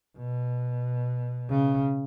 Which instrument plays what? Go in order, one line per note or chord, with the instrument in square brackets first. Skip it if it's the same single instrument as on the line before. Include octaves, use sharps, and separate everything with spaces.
[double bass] B2
C#3